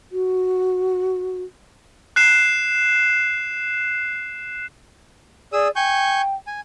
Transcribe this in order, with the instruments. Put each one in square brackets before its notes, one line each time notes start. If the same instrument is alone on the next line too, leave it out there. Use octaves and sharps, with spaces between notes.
[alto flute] F#4
[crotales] F#6 C7 E7
[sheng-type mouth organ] G#4 D#6 E6 [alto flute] D5
[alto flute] G5 [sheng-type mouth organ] G#5 C#6 G6
[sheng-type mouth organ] G#5